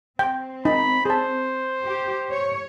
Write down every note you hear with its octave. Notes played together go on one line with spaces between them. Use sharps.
C4 G5
D#4 B5
G#4 C5 A5
G4
C#5